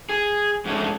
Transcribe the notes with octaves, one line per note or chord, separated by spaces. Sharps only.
G#4
G#2 G#3 A3 C#4 D4